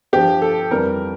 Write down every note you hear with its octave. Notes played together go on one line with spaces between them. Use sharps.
G2 F3 G4
A4
F2 E3 G3 A#4